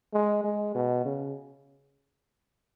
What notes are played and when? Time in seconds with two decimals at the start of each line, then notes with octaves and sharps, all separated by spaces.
0.13 G#3
0.44 G#3
0.75 B2
1.05 C#3